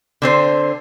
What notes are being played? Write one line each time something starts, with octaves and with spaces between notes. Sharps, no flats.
D3 C4 C5